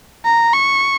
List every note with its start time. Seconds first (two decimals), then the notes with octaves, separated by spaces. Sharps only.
0.25 A#5
0.53 C#6